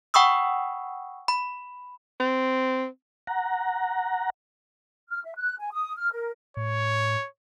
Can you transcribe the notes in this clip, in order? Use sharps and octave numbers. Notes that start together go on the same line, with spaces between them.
F#5 G5 B5 C#6 D#6 E6
B5
C4
F#5 A#5
F6
E5
F#6
G#5
D#6
F6
A#4
A2 C#5